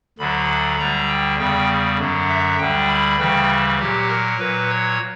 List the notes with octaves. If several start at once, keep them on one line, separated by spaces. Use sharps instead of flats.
D2 D3 F#3 B5
D2 D3 G3 A#5
G5
E2 C#3 G3 G5
F#2 D3 F#3
E5
D2 D3 G3 G5
B5
D2 C#3 E3 G3 G5
A#2 F#3 G4
A#4
A#2 F#3 B4
C#5